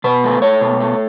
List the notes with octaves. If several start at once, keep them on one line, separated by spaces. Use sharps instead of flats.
B2 B4
A3
A3 C#5
B2
A3